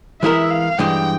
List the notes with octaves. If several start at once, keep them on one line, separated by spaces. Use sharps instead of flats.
E3 G#3 E4 A#4 E5
F5
G2 E3 G#3 G5